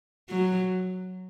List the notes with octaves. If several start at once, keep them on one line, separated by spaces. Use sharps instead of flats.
F#3